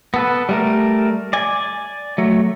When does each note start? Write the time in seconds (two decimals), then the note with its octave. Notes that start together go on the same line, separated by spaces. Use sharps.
0.14 B3 A4 B4
0.49 G3 A3 A#4
1.33 D5 G#5
2.18 F#3 A3